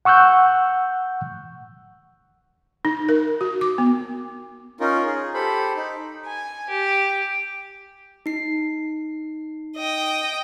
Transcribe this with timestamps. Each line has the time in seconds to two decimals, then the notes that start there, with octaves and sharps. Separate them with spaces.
0.05 F#5 C#6 E6 F#6 G6
2.85 D#4
3.09 A#4
3.41 F#4
3.61 D6
3.78 B3
4.80 C#4 D#4 F4 A#4
5.06 G#4
5.34 G4 A4 C5 B5
5.76 D#4
6.25 G#5
6.68 G4
8.26 D#4 C7
9.77 D#5 G5